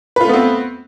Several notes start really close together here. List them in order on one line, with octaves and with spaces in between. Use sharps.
B4 F4 A3 B3 C4